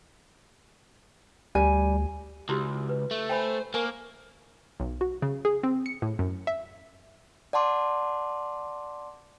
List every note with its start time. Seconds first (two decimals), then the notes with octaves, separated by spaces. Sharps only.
1.55 D2 G3 G#5
2.49 C#2 E4 F#4 G4
2.89 B4
3.11 A3
3.29 C5 G5 G#5 B5
3.74 A#3 A#4 C5 G#5 C#6
4.80 B1
5.01 F#4
5.22 C#3
5.45 G#4
5.63 C4
5.86 C#7
6.02 A2
6.19 F#2
6.47 E5
7.53 D5 F#5 A5 C6 D6